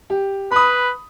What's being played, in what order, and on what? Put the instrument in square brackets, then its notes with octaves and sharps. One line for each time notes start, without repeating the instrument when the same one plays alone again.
[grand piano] G4
[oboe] B4 [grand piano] B5 D#6